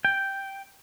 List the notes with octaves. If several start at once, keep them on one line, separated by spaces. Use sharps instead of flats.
G5